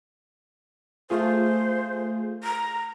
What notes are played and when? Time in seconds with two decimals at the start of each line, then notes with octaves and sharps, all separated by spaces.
1.10 A3 F4 G#4 C5
2.44 A#5